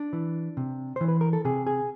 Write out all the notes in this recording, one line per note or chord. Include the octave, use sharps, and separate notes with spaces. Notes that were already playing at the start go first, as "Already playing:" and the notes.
Already playing: D4
E3
C3
E3 C5
B4
A#4
A4
C3 G#4
G#4